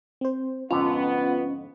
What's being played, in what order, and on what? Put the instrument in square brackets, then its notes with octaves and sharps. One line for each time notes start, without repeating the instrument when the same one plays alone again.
[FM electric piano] C4 C5
[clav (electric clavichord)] F2 G#2 D3 [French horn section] B3 [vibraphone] C#4 [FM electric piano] F4